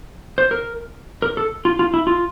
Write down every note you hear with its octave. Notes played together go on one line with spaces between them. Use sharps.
C5
A#4
A#4
A4
F4
F4
E4
F4